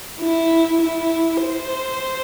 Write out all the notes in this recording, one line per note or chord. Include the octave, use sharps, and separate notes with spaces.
E4
E4
C5